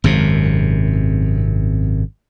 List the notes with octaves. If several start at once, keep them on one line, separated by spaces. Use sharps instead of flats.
G#1 F#2 C3